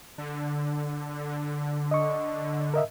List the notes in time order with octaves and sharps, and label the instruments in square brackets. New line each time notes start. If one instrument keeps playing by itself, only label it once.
[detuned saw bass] D3
[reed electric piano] D#5 C#6
A#4 D#5 E5